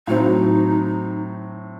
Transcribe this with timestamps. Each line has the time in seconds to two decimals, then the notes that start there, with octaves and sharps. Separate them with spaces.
0.07 A2 F#3 C4 D#4